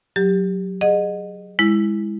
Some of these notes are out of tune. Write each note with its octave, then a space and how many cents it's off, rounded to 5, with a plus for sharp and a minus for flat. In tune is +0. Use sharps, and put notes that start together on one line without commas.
F#3 +0 G4 +10
G#4 -5 D#5 -25 F#5 -15
G#3 -20 E4 +0